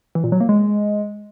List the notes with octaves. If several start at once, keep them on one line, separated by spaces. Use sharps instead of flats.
E3
A#2
F#3
A#3
G#3